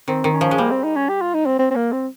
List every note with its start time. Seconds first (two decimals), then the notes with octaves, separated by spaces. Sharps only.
0.08 D#3 C4
0.24 D#3
0.33 C#4
0.41 F3
0.51 G#3
0.58 G3 A#3
0.71 C4
0.84 D#4
0.96 C#4
1.09 G4
1.21 F4
1.34 D#4
1.46 C4
1.59 C4
1.71 C4
1.75 A#3
1.92 C4